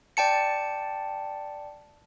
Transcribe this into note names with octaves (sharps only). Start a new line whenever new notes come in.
D5 G5 A5 C#7